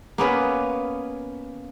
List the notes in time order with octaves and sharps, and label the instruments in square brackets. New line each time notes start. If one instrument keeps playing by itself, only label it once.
[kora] A#3 B3 C#4 B4